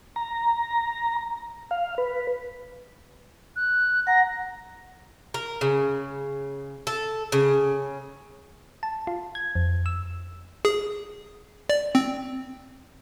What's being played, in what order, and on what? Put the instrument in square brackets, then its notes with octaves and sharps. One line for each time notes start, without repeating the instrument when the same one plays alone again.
[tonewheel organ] A#5
F5
B4
[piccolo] F#6
[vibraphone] F#5 A#5 [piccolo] A#6
[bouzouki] A#4
C#3
A4
C#3
[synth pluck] A5
F4
G#6
F2
E6
[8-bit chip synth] G#4
D5
C4